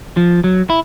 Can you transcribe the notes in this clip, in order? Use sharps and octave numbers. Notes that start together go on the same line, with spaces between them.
F3
F#3
E4